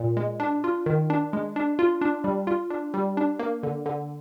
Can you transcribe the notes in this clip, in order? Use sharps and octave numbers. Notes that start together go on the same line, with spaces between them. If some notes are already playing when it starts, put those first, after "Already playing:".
Already playing: A#2
G#3
D4
F4
D#3
D4
G#3
D4
F4
D4
G3
F4
D4
G3
D4
A#3
D3
D3